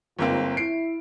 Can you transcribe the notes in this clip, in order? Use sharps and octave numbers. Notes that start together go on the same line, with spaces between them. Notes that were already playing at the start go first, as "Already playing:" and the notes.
G1 G#2 A#3 C4 F4
E4 C7 D7